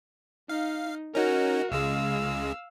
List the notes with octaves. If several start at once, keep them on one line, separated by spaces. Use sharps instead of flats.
D#4 F5
C#4 D#4 F#4 A#4
C#2 C#3 G#3 F5 E6